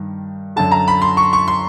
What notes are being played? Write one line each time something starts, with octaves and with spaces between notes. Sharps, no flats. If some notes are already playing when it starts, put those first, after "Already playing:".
Already playing: G2 D#3
F#2 D3 A5
A#5
B5
C6
C#6
C#6
C6